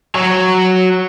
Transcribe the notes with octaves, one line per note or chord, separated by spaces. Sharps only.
F#3 C#5